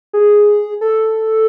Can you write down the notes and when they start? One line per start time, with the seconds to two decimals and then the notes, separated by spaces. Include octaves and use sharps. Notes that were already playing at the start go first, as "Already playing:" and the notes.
0.13 G#4
0.81 A4